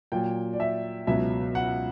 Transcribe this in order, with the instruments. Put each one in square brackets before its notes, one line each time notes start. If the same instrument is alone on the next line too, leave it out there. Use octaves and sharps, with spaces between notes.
[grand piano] A#2 F#3 G5
D5
E5
C#2 B2 F#3 E5
F#5